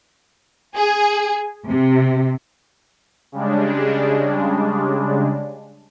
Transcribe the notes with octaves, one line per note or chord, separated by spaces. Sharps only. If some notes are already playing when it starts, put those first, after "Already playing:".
G#4
C3
C#3 G3 G#3 D4